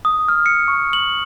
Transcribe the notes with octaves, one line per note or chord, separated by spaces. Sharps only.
D#6
F6
C#7
C#6
F#7